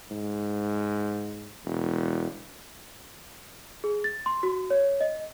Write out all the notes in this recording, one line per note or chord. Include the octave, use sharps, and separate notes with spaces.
G#2
E1
G#4
A6
C6
F#4
C#5
D#5